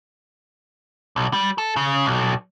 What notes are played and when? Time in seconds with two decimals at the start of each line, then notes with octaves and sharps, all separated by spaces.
1.16 B1
1.33 G3
1.58 A4
1.76 C#3
2.06 B1